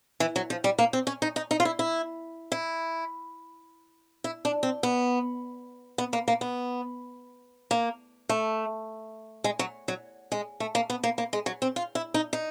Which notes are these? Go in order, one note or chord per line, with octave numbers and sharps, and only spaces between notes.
E3
F#3
F3
G3
A#3
C4
C#4
D#4
D#4
D#4
F4
E4
E4
E4
E4
D4
C4
B3
B3
A#3
A#3
B3
A#3
A3
G#3
F#3
F#3
G#3
A3
A#3
B3
A#3
A#3
G#3
F#3
C4
F4
E4
D#4
D#4